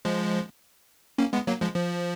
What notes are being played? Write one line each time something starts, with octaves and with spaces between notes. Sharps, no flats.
F3 G#3
A#3 C#4
G#3 B3
F#3 A#3
F3 G#3
F3